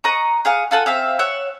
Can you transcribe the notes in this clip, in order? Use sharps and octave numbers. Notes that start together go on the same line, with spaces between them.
D#5 F#5 A#5 C#6
G#4 F5 F#5
F4 A4 F#5 G#5
C4 E5 F5
C#5 E5 F#5 F#6